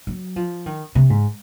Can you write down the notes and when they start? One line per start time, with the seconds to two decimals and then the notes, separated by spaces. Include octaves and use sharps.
0.07 F#3
0.36 F3
0.66 D#3
0.95 C3
1.10 G#2